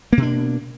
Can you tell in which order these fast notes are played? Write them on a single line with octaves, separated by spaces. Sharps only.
A#3 B2 D4